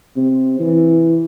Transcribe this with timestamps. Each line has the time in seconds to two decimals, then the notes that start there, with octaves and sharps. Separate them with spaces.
0.16 C3
0.59 E3